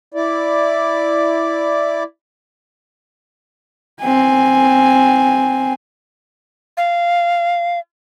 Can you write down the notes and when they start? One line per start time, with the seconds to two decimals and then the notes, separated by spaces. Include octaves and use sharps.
0.14 E4 D5
4.01 C4 G#5
6.77 F5